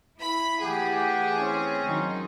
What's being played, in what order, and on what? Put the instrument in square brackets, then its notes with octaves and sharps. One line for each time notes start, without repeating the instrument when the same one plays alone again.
[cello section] E4 [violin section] B5
[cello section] E3 A3 [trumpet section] G4 F#5 A5 [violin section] G#4
[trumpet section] C4 C#4
[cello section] D#3 F#3 D#4